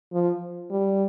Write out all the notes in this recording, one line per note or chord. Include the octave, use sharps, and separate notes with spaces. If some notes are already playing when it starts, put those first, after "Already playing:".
F3
G3